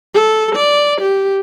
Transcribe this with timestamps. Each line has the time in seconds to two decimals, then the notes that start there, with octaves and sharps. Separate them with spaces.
0.14 A4
0.55 D5
1.01 G4